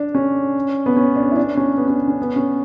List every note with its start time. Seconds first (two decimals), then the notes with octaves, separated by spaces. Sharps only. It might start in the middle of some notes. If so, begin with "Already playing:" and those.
Already playing: D4
0.15 C#4
0.86 B3
0.97 C#4
1.16 D4
1.31 E4
1.37 D4
1.57 C#4
1.78 B3
1.88 C#4
2.08 C#4
2.22 B3
2.36 C#4